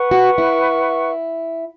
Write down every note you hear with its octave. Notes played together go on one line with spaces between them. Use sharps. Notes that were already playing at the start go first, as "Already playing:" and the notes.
Already playing: B4 F#5 C#6
F#4
E4